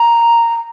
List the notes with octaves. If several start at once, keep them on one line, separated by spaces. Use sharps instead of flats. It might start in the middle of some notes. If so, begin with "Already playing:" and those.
Already playing: A#5